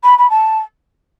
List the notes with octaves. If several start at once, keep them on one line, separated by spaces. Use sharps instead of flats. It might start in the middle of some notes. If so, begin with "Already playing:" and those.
B5
B5
A5